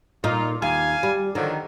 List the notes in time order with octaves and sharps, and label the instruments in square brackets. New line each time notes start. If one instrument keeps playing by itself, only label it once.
[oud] A#2 D#4 [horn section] F4
[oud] D#2 [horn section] F5 G#5
[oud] G3
[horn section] D3 F3 F#3 [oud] D#3